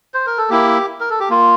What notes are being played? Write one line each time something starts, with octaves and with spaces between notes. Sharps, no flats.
C5
A#4
A4
A#3 E4 G4
A#4
A4
G4
A#3 F4